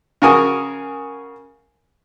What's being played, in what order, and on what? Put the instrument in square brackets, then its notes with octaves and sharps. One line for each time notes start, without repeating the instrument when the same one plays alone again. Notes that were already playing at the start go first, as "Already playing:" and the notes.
[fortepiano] C#3 F#4 A#4 G#5 D#6